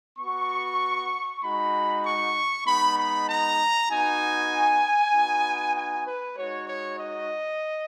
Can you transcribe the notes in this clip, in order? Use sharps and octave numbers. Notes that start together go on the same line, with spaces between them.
B3 F#4 C#6
G#3 D#4 F#4 B5
C#6
G#3 B3 D#4 B5
B5
A#5
B3 D#4 F#4 G#5
B3 D#4 F#4
G#5
B4
G#3 D#4 F#4 C#5
C#5
D#5